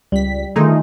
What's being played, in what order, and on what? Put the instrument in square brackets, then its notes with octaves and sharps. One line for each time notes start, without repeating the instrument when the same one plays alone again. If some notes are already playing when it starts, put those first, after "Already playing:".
[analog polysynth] C#2 B6 [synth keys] G3
[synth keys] D3 D#3 F4 [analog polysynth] A3 D#4 G#4